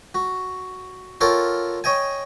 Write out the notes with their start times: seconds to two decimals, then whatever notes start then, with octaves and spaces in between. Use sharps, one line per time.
0.15 F#4
1.21 F4 A4 A#4 C#5 F#5 G5
1.84 C#5 D#5 G5 G#5